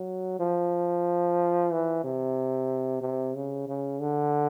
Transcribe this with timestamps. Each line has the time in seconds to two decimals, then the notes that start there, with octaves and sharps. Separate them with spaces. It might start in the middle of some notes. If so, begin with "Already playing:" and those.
Already playing: F#3
0.40 F3
1.72 E3
2.04 C3
3.01 C3
3.35 C#3
3.68 C#3
4.01 D3